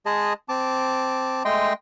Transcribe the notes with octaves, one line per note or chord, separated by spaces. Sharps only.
G#3 G#4 D#5 A5
C4 A5 D6
G#3 A3 D#5 G5 C6